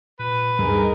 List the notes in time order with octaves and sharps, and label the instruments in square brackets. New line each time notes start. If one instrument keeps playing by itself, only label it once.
[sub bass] A#2 [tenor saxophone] B4
[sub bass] D2 [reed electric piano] G2 [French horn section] D#4 G#4 A#4